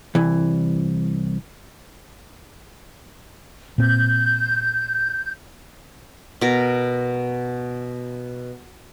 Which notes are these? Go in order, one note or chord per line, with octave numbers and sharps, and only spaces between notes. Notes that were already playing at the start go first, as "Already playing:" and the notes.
C2 E3
A#2 C4 G6
B2 A#4